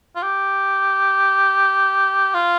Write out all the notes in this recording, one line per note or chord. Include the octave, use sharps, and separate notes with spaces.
F4
G4
F4